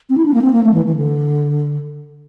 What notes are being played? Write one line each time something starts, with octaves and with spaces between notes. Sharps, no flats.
C4
E4
D4
A#3
C4
A#3
A3
E3
E3
D3